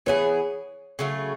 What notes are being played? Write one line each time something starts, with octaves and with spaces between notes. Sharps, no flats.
E3 B3 E4 G#4 C#5
C#3 F#3 A3